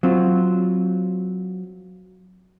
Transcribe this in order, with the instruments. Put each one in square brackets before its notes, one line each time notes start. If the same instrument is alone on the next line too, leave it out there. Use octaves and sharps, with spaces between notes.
[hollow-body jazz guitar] F#3 C4 F4